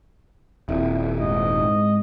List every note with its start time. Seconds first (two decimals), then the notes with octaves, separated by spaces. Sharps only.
0.69 D#1 C4 E4 E5
1.20 G#2 D#5